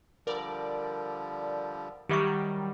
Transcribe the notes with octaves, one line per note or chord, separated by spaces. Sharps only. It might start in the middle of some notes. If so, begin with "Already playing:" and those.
D3 F3 G3 A#4 D5
D#3 F#3 G3 G4 E5 C#6